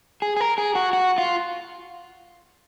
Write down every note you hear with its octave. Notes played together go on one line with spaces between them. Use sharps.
G#4
G#4
A#4
G#4
F#4
F#4
F4